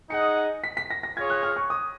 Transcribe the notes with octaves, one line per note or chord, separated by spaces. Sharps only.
D#4 G#4 D#5 F#5 C#7
B6
B6
A#6
A#6
F4 G#4 C#5 G#6
F#6
F6
C#6
D#6